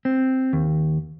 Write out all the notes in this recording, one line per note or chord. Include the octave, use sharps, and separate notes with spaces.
C4
D#2